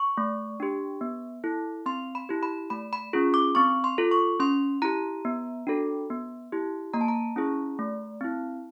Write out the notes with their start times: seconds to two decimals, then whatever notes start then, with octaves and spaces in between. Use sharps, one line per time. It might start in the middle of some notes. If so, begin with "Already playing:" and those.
Already playing: C#6
0.17 A3
0.60 D4 G4
1.01 B3
1.44 E4 A4
1.86 C4 C6
2.15 B5
2.29 E4 G4
2.43 B5
2.70 A3 B5
2.93 B5
3.13 C#4 F4 G#4
3.34 D6
3.55 C4 C#6
3.84 C6
3.98 F4 A4
4.11 C#6
4.40 C#4 C6
4.82 E4 G4 A#5
5.25 B3
5.67 D4 F#4 A4
6.10 B3
6.52 E4 G4
6.94 A#3 A#5
7.01 A5
7.08 A#5
7.36 C#4 E4 G#4
7.79 A3
8.21 C4 E4